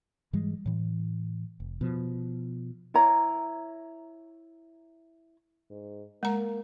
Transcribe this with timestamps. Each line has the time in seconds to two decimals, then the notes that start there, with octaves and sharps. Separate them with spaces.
0.33 G#2 E3 G3 G#3
0.66 A2 E3
1.60 F1
1.81 B2 F3
2.94 E4 C#5 A#5
5.70 G#2
6.23 G#3 A#3 A#5